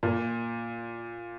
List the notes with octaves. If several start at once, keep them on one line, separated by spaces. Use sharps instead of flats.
A#2